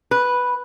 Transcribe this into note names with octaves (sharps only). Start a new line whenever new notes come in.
B4